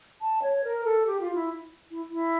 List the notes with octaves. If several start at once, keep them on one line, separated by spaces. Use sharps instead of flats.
A5
C#5
A#4
A4
G4
F4
E4
E4
E4